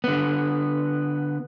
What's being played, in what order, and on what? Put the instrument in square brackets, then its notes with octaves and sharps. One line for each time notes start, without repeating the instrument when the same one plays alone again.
[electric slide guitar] D3 B3